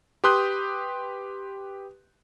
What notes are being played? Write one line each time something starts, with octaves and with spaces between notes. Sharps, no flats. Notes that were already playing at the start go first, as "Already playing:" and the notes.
G4 B4 C6 D#6 F#6 G6